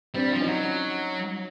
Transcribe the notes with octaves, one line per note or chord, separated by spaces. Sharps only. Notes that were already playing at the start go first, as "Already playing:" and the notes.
G3 C4 D4
F3
C#4 D#4
F#3